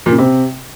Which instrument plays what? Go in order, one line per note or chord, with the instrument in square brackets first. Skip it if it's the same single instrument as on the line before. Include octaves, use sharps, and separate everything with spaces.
[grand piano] A#2
C#3
C3